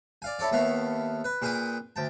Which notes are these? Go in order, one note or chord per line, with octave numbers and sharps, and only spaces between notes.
D5 F5 G#5
E4 A4 C#5 D5
D#2 A3 B3 E4 F5 C#6
B4
A#2 G#4 B4 G5 G#5 D#6
D2 G5 A5